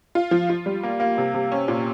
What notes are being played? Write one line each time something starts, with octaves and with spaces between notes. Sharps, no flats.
F4
F3
F4
G3
A#3
A#3
C3
C3
C#4
A#2